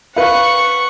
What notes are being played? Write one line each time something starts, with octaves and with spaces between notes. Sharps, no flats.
B4 F5 F#5 C#6